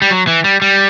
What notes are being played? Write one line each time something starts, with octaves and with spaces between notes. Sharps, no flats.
G3
F#3
E3
G3
G3